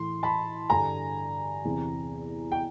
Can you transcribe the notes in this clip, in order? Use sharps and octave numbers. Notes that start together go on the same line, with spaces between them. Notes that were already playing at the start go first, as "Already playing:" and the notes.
Already playing: A2 E3 C6
A5 B5
G2 D3 G#5 A#5
E2 C3 E3
G5